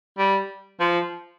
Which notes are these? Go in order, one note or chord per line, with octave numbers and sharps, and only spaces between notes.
G3
F3